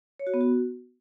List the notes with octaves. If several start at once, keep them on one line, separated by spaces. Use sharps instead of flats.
C#5
F#4
B3
F#4